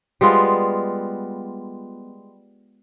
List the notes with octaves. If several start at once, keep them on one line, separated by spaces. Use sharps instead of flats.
G3 G#3 B3 F4